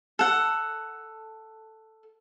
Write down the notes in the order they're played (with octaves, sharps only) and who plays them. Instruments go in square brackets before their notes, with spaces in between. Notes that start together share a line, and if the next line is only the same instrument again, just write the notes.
[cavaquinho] A4 F#5